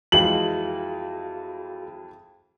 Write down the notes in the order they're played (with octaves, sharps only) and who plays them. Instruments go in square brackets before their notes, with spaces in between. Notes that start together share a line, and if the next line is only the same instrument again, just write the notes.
[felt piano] F2 E3 G#3 [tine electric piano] F#4 G#4 F5 [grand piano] F#7